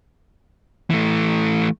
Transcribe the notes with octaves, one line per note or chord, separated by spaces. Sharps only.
E3 A3